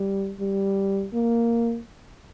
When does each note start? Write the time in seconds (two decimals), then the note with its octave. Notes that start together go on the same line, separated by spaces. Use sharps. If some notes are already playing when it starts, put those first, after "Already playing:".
Already playing: G3
0.40 G3
1.13 A#3